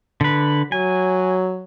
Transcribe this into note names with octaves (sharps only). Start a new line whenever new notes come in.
D3 B4
F#3 G#5